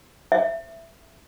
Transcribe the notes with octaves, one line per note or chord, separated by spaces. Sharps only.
E5